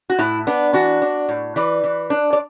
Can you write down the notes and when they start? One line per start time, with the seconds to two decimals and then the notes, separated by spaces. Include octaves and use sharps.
0.10 F#4
0.19 A2 E4
0.47 B3 D4
0.73 E3 D4 F#4
1.02 D4
1.29 A2
1.56 E3 B4 D5
1.84 E3
2.10 D4
2.33 D5